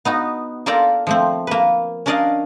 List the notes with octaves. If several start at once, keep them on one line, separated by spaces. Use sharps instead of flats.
B3 D#4 F#4
A#3 F4 A4 A#4 D5 G5
F3 A3 C4
A#3 B4
C#4 D4 A#4 D5 D#5 F5